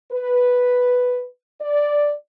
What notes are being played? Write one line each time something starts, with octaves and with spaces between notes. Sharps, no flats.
B4
D5